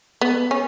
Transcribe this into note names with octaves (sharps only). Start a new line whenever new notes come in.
B3
C#4